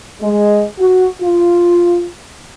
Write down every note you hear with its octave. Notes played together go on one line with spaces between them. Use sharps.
G#3
F#4
F4